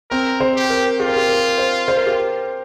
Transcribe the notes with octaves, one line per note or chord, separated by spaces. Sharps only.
C4 A#4
C5
G4
A#4
F4 G4
A#4
G4
A#4
C5
C5
A#4
G4